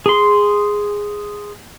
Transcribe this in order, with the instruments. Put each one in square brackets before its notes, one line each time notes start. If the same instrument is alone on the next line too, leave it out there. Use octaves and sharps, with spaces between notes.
[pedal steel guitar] G#4 C6